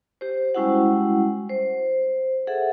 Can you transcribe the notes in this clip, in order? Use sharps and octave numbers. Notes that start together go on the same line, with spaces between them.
G4 C5
G3 G#3 C#4 E4 F#4 F#5
C5
G#4 A4 E5 F#5